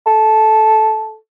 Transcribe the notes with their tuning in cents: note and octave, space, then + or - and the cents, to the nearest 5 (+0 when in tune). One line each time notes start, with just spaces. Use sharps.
A4 -15